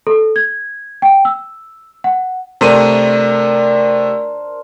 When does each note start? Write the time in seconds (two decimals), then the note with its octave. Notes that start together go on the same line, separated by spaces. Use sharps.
0.07 A4
0.36 G#6
1.02 G5
1.25 E6
2.04 F#5
2.61 C3 A3 D4 A#4 C5 D#7